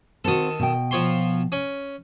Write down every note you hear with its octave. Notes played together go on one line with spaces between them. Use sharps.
D#3 C4 F#4 A4
B2 G5
F3 C#5 C6
C#4